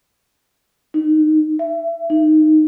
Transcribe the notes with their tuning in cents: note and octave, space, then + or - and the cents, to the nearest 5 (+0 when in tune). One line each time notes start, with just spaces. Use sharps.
D#4 -15
E5 +25
D#4 -10